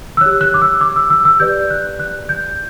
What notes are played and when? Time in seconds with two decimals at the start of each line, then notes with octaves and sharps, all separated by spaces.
0.17 E6
0.21 G4 C#5 F#6
0.41 F#6
0.54 D6
0.62 E6
0.81 D6
0.96 E6
1.10 E6
1.25 E6
1.40 G4 B4 D5 G6
1.70 F#6
2.00 F#6
2.29 G6